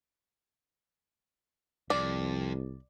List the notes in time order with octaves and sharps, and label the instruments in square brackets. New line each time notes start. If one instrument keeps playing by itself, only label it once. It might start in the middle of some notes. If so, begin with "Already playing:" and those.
[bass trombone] C2 [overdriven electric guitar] F2 [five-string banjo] D5